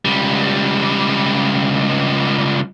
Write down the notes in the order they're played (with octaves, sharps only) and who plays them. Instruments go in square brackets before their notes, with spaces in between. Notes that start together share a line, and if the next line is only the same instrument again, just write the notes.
[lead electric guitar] C#2 G3